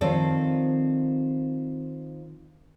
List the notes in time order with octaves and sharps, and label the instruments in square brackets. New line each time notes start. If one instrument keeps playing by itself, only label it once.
[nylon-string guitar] D#3 F3 C4 A4 C5 D5